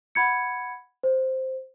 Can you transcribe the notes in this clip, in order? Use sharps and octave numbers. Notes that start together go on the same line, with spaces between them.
F#5 B5 G#6 C#7
C5